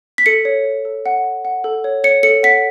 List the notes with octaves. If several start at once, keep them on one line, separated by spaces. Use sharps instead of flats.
B6
A4 C#7
C#5
C#5
A4
F#5
F#5
F#5
A4
C#5
C#5 C#7
A4 C#7
F#5 B6